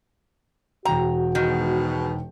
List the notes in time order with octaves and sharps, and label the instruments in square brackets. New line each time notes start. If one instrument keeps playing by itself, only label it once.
[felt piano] E1 G5 [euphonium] F#4 [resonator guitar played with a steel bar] A#5
[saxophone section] G#2 B2 [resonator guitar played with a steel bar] D#3